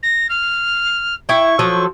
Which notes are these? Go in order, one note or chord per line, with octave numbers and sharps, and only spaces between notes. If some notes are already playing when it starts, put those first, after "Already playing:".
A#6
F6
E4 G5 C#6
F3 F#3 A4